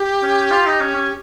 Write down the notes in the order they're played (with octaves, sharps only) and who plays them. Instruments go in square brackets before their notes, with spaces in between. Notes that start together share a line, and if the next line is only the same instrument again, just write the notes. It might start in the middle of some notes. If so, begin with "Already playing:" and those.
Already playing: [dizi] G4
[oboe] C#4
F4
D#4
C#4
C#4